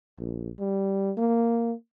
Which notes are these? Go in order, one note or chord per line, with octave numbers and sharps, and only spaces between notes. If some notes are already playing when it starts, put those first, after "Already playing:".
A#1
G3
A#3